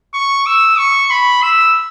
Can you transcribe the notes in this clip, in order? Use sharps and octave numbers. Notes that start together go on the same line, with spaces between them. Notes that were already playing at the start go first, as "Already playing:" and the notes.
C#6
E6
C#6
B5
E6